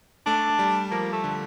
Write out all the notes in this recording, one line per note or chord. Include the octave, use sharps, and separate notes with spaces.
A3 D4
A3
G3
F3 A#3
A3
D3